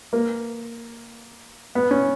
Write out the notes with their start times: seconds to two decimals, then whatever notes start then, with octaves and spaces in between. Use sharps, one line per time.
0.13 A#3
1.75 B3
1.91 C#4